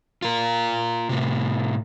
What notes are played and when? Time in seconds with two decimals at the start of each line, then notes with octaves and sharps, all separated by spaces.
0.22 F4 A#4
1.09 A2 C3